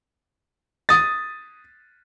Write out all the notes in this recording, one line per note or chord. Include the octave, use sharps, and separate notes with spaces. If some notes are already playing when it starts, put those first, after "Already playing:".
D#6 A6